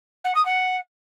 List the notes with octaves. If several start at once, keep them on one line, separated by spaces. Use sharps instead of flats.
F#5
D#6
F#5